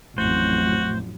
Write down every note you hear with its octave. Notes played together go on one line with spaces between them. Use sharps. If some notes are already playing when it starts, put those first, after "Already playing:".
A1 F2 A2 F#3 A3 F#4 C5